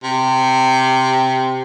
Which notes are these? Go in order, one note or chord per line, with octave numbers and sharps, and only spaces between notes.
C3